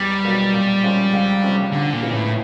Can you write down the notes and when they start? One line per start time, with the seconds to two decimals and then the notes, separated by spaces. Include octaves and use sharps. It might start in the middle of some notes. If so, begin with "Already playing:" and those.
Already playing: E2 G3
0.24 B2 F#3 A#3
0.53 A#2
0.83 F3 G#3 C#4
1.13 C#2
1.43 C3 F3 A3 C#4
1.72 D#2 D3
1.93 A#2
2.02 C#3 E3 G#3 B3
2.13 A2